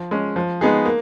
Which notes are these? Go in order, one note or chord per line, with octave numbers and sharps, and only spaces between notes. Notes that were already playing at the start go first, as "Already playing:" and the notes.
Already playing: F3
G#3 C#4
F3
G#3 B3 D#4 G#4
A#3